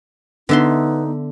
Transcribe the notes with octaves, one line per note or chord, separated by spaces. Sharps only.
D3 B3 D#4 E5 C6